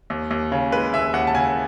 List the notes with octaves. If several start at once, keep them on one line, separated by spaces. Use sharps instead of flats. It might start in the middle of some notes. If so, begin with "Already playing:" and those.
D#2
D#2
C#3
G#3 B4
D#2 E5
D#2 F#5
A5
C#3 G#5